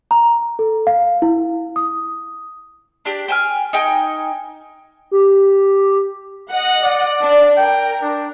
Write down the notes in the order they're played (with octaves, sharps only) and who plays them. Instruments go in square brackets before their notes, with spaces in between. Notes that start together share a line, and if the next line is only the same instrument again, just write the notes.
[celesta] A#5
A4
F5
E4
D#6
[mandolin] D4 G4
G5 G#5 F6
D#4 G5 G#5
[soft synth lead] G4
[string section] D#5 F#5
[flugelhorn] D5
[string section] D4
[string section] A#4 [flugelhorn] G5
[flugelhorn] D4